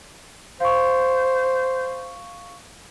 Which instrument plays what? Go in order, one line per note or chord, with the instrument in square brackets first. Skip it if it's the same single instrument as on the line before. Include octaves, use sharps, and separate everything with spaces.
[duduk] C5 [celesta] F5 C#6